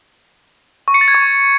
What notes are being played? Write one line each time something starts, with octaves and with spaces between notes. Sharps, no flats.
C#6
C#7
A6
G#6
C#6